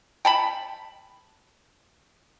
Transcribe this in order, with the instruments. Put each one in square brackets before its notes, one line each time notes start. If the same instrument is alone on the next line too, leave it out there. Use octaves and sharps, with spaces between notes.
[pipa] G5 A5 B5